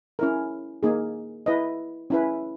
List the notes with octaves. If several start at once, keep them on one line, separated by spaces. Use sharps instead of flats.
C#4 E4 A#4
A#3 D#4 G#4
E4 B4 D#5
C#4 E4 B4